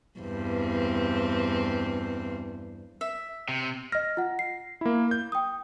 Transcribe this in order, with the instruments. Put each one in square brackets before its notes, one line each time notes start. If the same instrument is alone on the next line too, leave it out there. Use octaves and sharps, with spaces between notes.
[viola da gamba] E2 G2 C4
[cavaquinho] E5
[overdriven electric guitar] C3
[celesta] D#5 F6 [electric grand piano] A#6
[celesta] F4 F#5
C7
[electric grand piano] A#3 E4
G6
[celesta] G5 D#6